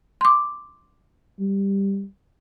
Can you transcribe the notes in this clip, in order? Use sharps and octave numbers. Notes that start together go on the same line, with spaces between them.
C6 D6
G3